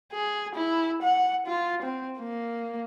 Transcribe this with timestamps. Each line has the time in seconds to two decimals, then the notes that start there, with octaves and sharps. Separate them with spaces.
0.12 G#4
0.55 E4
1.03 F#5
1.46 F4
1.82 C4
2.19 A#3